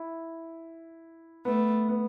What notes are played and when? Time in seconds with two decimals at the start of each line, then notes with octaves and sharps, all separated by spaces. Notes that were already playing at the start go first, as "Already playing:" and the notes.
Already playing: E4
1.45 A3 B3
1.89 B3